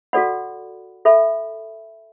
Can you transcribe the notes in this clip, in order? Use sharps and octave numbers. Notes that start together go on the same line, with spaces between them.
F#4 A4 D5 F#5 B5
A4 E5 B5